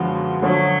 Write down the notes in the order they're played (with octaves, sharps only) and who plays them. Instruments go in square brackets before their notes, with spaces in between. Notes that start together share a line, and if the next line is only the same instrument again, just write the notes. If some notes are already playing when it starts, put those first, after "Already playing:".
Already playing: [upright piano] F#2 D3 G#3 B3 F#4 [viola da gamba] F3
[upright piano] D3 F3 A3 C#4 [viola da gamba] F#3